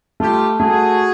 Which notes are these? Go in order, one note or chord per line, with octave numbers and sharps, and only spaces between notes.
A3 F4 G4
A3 F#4 G#4